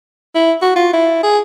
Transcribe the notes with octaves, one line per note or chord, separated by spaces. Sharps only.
E4
F#4
F4
E4
G#4